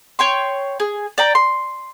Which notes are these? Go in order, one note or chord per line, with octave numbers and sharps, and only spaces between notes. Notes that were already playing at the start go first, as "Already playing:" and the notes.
C#5 G5 C6
G#4
D5 G5 A#5
C6